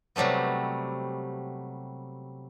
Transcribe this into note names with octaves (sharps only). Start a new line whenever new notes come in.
C3 F#3 G3 A3 B3